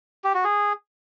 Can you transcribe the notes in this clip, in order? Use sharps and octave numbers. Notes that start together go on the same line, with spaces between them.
G4
F#4
G#4